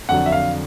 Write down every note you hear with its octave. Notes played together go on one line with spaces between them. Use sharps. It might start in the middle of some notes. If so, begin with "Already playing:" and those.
F2 D3 F#3 F#5
E5
F5